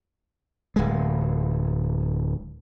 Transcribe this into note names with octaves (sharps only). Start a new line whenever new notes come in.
D1 G#3